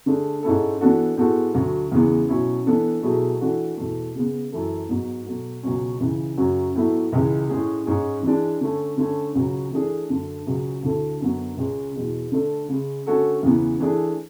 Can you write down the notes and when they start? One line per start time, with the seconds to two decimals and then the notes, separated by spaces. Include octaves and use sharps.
0.06 D3 A3 D4 G#4
0.43 G#2 G#3 C#4 E4 A4
0.81 E3 B3 D4 F#4 A4
1.17 A2 G#3 B3 F#4 A4
1.54 D2 D3 F#3
1.92 E2 C#3 E3 G#3 B3
2.28 B2 F#3 C#4 E4
2.66 E3 B3 D4 A4
3.03 B2 F#3 A3 E4 G#4
3.40 E3 A3 D4 F#4 A4
3.77 E2 B2 A3
4.15 C#3 G#3 B3
4.52 F#2 E3 A3 E4 A4
4.89 G#2 F#3 B3
5.26 B2 F#3 A3
5.63 C#2 B2 F#3 C#4
6.00 C#2 C#3 E3
6.37 F#2 C#3 F#3 C#4 F#4
6.75 A2 F#3 B3 E4 A4
7.12 C#2 C#3 E3 G#3
7.49 A2 G#3 C#4 G#4
7.86 G#2 G#3 C#4 G#4
8.23 E3 G#3 D4
8.61 D3 A3 C#4
8.98 D3 A3 C#4
9.34 C#2 C#3 F#3 C#4
9.72 E3 A3 D4 G#4
10.09 F#2 D3 A3
10.46 C#2 C#3 F#3 C#4 G#4
10.83 D2 D3 A3 E4 A4
11.21 F#2 D3 F#3 B3 F#4
11.57 C#2 C#3 G#3 C#4
11.95 E2 B2 G#3
12.32 D3 A3 D4 A4
12.69 C#3 G#3 C#4
13.06 D3 A3 C#4 F#4 A4
13.43 E2 C#3 E3 B3
13.80 E3 A3 D4 G#4